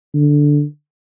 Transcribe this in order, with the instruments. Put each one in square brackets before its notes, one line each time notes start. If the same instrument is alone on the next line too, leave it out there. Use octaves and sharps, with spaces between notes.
[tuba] D3